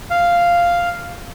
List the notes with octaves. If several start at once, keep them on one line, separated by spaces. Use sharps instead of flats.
F5